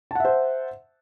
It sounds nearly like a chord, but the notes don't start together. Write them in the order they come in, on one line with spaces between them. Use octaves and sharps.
A5 F#5 E5 C5